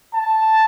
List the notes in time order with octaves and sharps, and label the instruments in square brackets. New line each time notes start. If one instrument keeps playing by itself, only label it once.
[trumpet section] A5